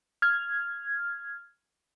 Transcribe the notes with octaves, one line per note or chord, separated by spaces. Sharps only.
F6 G#6